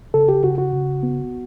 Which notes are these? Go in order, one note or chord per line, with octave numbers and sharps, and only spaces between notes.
C#3 A4
G4
C#3 F#4
F#4
C#3
B3